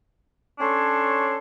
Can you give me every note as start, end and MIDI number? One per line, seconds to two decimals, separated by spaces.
0.59 1.36 61
0.59 1.36 62
0.59 1.36 69
0.59 1.36 73
0.59 1.36 84